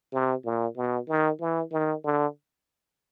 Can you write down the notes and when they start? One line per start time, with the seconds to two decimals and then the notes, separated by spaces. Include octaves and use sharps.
0.13 C3
0.45 A#2
0.77 B2
1.08 D#3
1.40 E3
1.72 D#3
2.04 D3